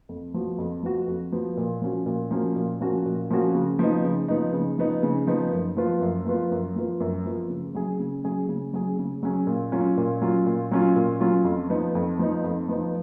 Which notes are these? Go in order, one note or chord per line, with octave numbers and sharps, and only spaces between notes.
F2
F3 B3 F#4
F2
F3 B3 F#4
F2
F3 B3 F#4
A#2
F3 A#3 C#4 F#4
A#2
F3 A#3 C#4 F#4
A#2
F3 A#3 C#4 F#4
A#2
F3 A#3 C#4 F#4
C#3
F3 B3 D#4
C#3
F3 B3 D#4
C#3
F3 B3 D#4
C#3
F3 B3 D#4
F#2
F3 B3 F4 B4
F#2
F3 B3 F4 B4
F#2
F3 B3 F4 B4
F#2
F3 B3 F4 B4
C#3
F#3 C#4 G#4
C#3
F#3 C#4 G#4
C#3
F#3 C#4 G#4
C#3
F#3 C#4 G#4
A#2
F#3 C#4 F4
A#2
F#3 C#4 F4
A#2
F#3 C#4 F4
A#2
F#3 C#4 F4
F2
F3 B3 D#4
F2
F3 B3 D#4
F2
F3 B3 D#4